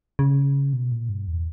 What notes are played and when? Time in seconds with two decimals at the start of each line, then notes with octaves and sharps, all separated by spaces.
0.19 C#3
0.73 B2
0.92 A#2
1.09 G2
1.28 E2